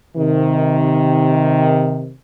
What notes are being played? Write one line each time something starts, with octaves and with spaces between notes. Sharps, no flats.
C3 D#3